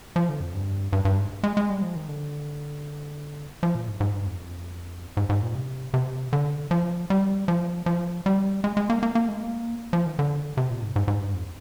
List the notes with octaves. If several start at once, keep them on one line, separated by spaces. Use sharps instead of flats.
F3
D3
F2
G2
G2
G2
G#2
G#3
G#3
G3
F3
D#3
D3
F3
A#2
G#2
G#2
G2
F2
G#2
G#2
A#2
C3
C3
D3
F3
G3
F3
F3
G3
G#3
G#3
A#3
A#3
A#3
G#3
A#3
F3
D#3
D3
C3
A#2
G#2
G#2
G#2
G2
F2